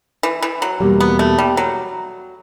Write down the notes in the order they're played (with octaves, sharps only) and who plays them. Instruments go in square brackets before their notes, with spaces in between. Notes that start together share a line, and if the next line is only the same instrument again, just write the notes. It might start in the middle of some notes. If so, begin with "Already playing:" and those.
[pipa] E3
E3
F#3
[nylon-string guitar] E2 B2 G3 A#3
[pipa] B3
A3
G3
F#3